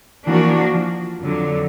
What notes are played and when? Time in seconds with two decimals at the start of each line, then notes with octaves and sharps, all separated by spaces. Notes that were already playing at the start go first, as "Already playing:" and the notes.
0.27 E3 F3 A#3 D4 F#4
0.74 F3
1.21 F2 D3 F#3